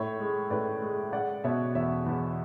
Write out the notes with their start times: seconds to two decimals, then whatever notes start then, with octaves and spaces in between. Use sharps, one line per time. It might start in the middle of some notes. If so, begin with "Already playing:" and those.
Already playing: A2 C#5 E5
0.20 G#3
0.50 A2 B4 D5
0.82 G#3
1.13 G#3 D5 F#5
1.44 B2 C#5 E5
1.75 E2 C#5 E5
2.06 E2